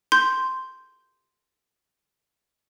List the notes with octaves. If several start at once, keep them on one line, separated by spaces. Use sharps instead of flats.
C6 G6